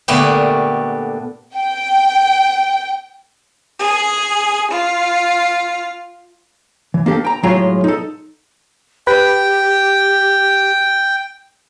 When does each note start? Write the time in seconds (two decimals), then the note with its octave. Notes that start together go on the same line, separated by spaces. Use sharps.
0.08 A#2 D3 A3 B3 D4 G4
1.56 G5
3.81 G#4
4.71 F4
6.94 E3
7.06 A#3 D4 G4 A4
7.25 G5 A#5
7.43 A2 F#3 G#3 F4 G5 A#5
7.84 D#4 A4
9.07 G4 B4 G5